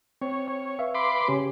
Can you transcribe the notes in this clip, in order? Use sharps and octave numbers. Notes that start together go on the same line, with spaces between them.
C4 C#5
C#5
B4 E5 F5
B5 C6 D6
C#3 C#4 G4 C#5